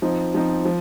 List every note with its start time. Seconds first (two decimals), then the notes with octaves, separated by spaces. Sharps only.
0.02 F3 C4 D#4
0.34 F3 C4 D#4
0.65 F3